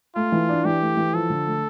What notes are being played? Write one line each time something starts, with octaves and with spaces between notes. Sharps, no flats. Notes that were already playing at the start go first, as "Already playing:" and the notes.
A3 F4
E3
D4
E3 G4
A3
E3
F3 A4
D3
A3